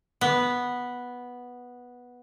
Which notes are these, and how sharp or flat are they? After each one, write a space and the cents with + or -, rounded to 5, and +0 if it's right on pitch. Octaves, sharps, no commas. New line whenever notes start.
B3 -5